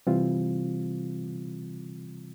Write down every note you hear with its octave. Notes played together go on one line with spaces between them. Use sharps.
C3 E3 G3 C4 F4